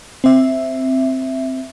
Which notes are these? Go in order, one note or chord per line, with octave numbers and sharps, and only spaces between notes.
C4 E5